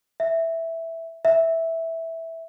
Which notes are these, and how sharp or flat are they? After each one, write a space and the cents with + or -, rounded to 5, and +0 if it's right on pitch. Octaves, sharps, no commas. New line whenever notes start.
E5 +0
E5 -5